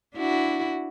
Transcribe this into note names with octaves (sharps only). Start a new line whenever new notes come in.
D4 E4 F#4